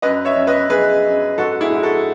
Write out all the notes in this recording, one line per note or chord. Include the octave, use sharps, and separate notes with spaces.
F#2 B4 D#5
C#5 E5
F#2
B4 D#5
F#2 G#4 B4
F#2
G#2 F#4 A4
E4 G#4
G#2
F#4 A4